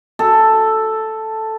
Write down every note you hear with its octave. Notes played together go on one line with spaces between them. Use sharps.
A4